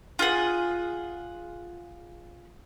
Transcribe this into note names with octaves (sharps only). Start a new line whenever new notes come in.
F4 G#4 F#5